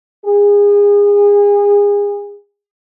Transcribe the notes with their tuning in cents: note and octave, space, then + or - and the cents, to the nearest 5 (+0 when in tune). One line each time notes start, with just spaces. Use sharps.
G#4 -30